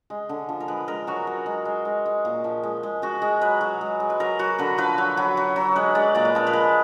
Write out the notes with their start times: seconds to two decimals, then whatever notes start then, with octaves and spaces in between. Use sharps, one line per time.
0.10 G#3
0.29 D3
0.49 F3
0.60 A#4
0.68 G#3 B4
0.88 G#3 A#4
1.07 F#3 F#4
1.27 F#3
1.46 G#3
1.65 G#3
1.85 G#3
2.06 G#3
2.25 A#2
2.44 F3
2.63 G#3
2.83 G#3
3.02 G#3 F#4
3.22 G#3
3.41 F#3 B4
3.61 F#3
3.81 G#3
4.00 G#3
4.10 B4
4.20 F#3 A#4
4.39 F#3 F#4
4.58 D3 B4
4.78 F3 B4
4.98 F#3
5.17 F#3
5.37 F#3
5.56 F#3
5.76 G#3 B4
5.95 G#3 D5
6.15 A#2 D5
6.25 B4
6.35 F3 A#4
6.47 B4
6.53 G#3